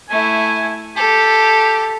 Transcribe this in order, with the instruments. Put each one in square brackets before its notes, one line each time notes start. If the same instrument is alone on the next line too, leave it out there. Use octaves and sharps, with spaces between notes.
[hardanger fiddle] A3 E4 [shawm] G#5
[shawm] G4 [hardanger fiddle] A4